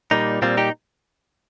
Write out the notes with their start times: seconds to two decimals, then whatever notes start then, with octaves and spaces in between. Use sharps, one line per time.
0.11 A#2 G3 A#3 D#4
0.42 A#2 G3 C4 F4
0.57 D#4 G4